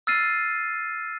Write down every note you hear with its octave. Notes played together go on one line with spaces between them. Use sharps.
E6 F6 A6 C7 D#7